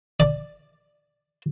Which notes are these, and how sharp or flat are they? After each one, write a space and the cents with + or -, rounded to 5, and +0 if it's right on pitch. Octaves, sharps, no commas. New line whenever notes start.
D5 +5